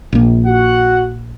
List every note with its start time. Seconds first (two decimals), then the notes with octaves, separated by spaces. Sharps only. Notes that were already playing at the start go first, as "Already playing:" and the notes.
0.13 A#1 A#3
0.46 F#4 F#5